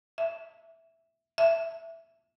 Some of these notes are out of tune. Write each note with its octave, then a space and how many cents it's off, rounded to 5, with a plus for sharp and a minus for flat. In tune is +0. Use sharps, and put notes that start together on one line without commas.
E5 +0
E5 +5